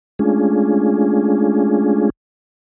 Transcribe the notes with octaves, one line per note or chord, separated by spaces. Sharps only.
G#3 A3 C#4 D4 F4 G#4